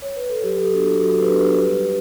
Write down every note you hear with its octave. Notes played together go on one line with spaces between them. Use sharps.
C#5
B4
A4
F#3 G4
A4
G4
B3 D4 F#4
F#3 F#4 A4
G4 B4
B3 D4 F#4
G4 B4
G3